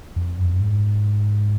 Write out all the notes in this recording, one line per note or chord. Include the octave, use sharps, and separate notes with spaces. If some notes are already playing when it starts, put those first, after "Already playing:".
F2
F#2
F2
F#2
G#2